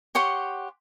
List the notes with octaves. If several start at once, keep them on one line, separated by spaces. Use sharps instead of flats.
G4 C#5 F#5 C6